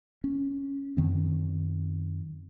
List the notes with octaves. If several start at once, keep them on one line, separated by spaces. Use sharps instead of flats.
C#4
F#2 D#3 C4